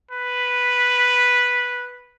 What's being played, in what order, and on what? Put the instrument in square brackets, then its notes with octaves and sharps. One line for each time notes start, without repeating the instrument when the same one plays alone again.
[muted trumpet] B4